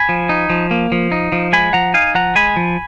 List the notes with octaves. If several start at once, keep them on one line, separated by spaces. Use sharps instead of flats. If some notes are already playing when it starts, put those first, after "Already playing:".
Already playing: G#5 B5
F3
D#4
F3
A#3
F3
D#4
F3
G#3 G#5 B5
F3 F#5 A#5
D#4 F5 G#5
F3 F#5 A#5
G#3 G#5 B5
F3